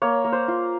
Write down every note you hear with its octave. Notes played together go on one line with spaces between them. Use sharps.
A#3 C#5
A#3
C5
F4